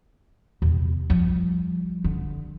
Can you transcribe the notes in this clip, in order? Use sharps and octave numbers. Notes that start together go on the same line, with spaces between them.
E2 C3
F3 G3
D3